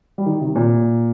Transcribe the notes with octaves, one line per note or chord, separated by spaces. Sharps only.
G3
D#3
C3
A#2